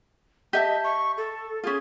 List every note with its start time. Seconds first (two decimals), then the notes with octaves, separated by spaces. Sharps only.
0.53 G4 D#5 E5 A5
0.84 C#6
1.17 A4
1.64 C#4 F4 G#4